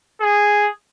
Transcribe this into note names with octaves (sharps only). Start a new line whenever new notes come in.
G#4